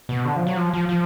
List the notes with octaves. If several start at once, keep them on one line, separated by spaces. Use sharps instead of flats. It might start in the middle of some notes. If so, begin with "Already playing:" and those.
B2
D3
F3
F#3
F3
F3
F3